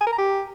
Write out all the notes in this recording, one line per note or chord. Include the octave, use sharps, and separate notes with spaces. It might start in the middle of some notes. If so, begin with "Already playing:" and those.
G#5
A#4
A#5
G4